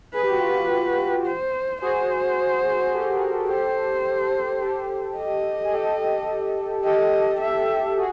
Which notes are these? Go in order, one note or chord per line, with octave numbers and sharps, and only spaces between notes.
G#4 B4
G4
F#4
F4 G4
C5
F#4 G#4 C5
G4 A4
G#4 A#4
G4 A4
G4 A4 C5
G4 A4
D#5
G#4
G4 A4
G4 A4 D#5
E5
F#4 G#4